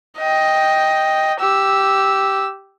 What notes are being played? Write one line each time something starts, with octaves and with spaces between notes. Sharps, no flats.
D#5 G5
G4 E6